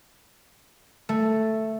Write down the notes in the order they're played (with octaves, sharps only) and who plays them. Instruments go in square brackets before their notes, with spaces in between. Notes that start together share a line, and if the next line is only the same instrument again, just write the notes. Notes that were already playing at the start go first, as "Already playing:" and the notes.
[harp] A3